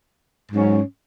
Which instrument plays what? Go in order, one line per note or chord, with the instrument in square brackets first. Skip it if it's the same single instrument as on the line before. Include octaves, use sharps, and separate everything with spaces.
[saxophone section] G#2 F#3 C#4